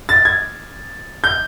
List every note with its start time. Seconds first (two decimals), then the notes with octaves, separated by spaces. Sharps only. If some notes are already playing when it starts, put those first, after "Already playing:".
0.09 A6
0.25 G#6
1.24 G6